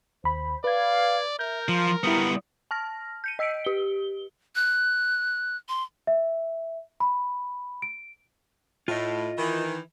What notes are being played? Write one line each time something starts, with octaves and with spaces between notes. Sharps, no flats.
D#2 C5 B5
B4 D5 F5 G#6
A#4 E5 G6
F3 C6
G3 B3 E4 A#5 D#6
A5 F6 A#6
G6 C#7 D#7
D#5 E6 B6 C#7 D7
G4 G7
F#6
C6
E5
B5
D7
A2 F4 D#5
D#3 E3